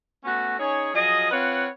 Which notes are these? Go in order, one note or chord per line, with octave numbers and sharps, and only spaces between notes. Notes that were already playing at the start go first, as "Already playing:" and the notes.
A3 B3 C#4 F#4
C#4 D#4 G#4 C#5
F3 F#3 G#4 D#5
C4 F4 B4 C#5 F5 F#5